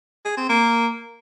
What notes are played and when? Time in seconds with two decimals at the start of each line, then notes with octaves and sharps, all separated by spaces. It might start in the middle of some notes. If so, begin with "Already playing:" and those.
0.25 G#4
0.37 C4
0.49 A#3